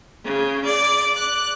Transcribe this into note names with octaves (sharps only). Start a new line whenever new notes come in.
C#3
D5
F#6